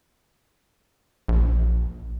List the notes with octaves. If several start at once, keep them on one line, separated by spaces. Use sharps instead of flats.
A#1